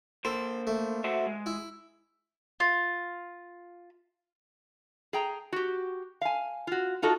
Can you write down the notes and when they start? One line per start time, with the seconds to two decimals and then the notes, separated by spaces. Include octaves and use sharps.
0.25 A#3 A4 C5
0.67 A3
1.04 F#4 C5 E5
1.26 G#3
1.46 E4
2.60 F4
5.13 G#4 G5 A#5
5.52 F#4 G4
6.21 F5 G#5
6.67 F4 F#4
7.02 D#4 F4 F#4 A4